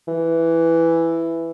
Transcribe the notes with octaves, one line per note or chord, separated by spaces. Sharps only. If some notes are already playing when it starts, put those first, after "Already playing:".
E3